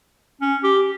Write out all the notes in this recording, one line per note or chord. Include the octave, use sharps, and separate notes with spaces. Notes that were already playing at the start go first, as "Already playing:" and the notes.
C#4
G4